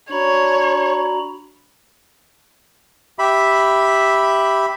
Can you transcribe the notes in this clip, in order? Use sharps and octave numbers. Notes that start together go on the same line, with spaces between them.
D4 F#4 C#5 A#5 B5
G4 E5 B5